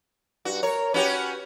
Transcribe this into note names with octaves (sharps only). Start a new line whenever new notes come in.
G2 F#4
A#4 C#5
C#4 F#4 G4 B4